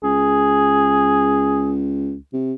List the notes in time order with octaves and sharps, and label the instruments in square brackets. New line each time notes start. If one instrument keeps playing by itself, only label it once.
[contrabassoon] C#2 [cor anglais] G#4
[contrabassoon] C3